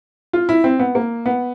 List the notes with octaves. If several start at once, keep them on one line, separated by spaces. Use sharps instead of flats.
F4
E4
C4
B3
A#3
B3